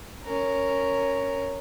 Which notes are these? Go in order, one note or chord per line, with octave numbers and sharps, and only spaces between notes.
C#4 A#4